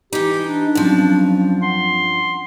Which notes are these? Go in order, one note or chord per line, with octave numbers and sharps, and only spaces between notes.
E3 D#4 G4
D4
G2 F3 F#3 C4 C#4
F#5 C6